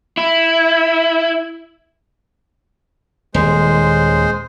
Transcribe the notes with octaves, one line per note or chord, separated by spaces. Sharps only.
E4
D#1 G#3 C5